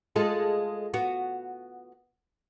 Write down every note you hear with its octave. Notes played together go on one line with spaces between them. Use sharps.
G#3 F4 A4
B3 F#4